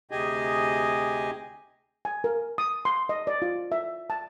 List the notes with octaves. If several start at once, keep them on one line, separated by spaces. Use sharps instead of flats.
D2 C3 G4 G#4 D#5 G#5
G#5
A#4
D#6
C6
D#5
D5
F4
E5
A5